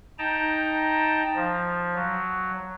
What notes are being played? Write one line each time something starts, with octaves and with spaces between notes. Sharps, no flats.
D#4 G5 A5 A#5
F3
F#3